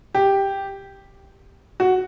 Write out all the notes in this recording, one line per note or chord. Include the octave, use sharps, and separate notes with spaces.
G4
F#4